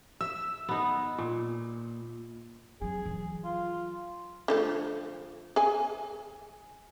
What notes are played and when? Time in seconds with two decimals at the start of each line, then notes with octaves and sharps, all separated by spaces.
0.21 E5 E6
0.69 B3 D#4
1.18 A#2
2.81 F#3 C4 G#4
3.05 E3 F#3
3.45 F4
4.48 D3 F3 A3
5.56 G#4 G#5